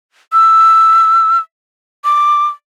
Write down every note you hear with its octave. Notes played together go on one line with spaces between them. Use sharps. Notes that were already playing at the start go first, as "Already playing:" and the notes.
E6
D6